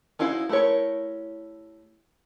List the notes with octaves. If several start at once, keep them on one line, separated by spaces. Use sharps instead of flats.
C#4 D#4 E4 F#4 F5
A3 E4 G4 A#4 C#5